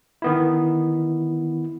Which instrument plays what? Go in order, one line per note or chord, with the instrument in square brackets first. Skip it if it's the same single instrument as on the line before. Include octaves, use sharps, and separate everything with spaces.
[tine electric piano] D#3 B3 E4